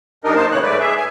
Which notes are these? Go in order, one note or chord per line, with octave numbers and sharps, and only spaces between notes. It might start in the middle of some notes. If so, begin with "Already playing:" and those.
F#2 G3 D4 D#4 A#4 D#5
A#3 D#4 C5 A5
A2 C#3 E3 C#5 F#6
G#2 A3 B4 D5
G#4 E5
G#5